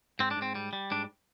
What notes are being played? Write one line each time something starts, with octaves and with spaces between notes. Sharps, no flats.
G#2 C4
D4
G#2 C4
G3
G3
G#2 D4